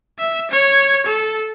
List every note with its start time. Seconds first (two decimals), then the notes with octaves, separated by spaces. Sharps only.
0.19 E5
0.51 C#5
1.06 A4